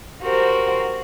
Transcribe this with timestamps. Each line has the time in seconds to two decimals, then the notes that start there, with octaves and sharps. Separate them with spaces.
0.22 F#4 G4 A#4 C5